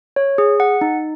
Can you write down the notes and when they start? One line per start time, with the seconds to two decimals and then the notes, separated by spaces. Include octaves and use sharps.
0.16 C#5
0.38 G#4
0.60 F#5
0.81 D#4